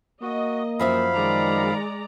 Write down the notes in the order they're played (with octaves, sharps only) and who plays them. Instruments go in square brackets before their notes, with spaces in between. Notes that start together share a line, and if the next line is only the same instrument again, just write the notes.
[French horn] A#3 [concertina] F#4 [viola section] D#5
[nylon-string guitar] F#2 F3 E5 [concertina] F5 B5
[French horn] D#3 [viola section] G#3 D5 A#5